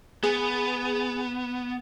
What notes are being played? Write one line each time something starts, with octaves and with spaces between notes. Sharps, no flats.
B3 G#4